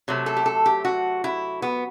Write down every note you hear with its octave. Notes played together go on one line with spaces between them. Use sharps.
C3 F#3 A3
A4
G4
A4
G4
F#4
E4
B3